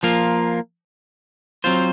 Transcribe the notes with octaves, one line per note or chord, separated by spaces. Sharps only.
F3 A#3 F4 A#4
F#3 C4 F4 C5